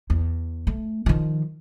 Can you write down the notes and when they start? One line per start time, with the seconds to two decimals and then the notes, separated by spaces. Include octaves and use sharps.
0.10 E2
0.67 A3
1.06 D#3 F3